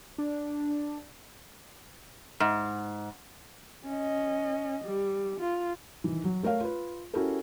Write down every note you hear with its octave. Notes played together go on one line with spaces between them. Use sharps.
D4
G#2
C#4 D#5
G3
F4
D#3 E3
F#3
A3 A#4 C#5 F5
F4 B4
C#4 E4 F#4 G4 A4 A#4